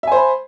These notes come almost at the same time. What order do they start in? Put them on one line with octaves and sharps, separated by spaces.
E5 G#5 C5 B5